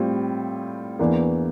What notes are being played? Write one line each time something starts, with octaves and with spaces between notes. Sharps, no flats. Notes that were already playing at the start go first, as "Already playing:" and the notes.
Already playing: A2 G3 C4 F4
E2 E3 A#3 D4